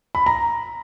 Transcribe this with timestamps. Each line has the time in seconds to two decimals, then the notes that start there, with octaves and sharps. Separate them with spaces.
0.15 B5
0.26 A#5